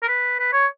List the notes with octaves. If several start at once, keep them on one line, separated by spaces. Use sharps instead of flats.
A#4
B4
B4
C#5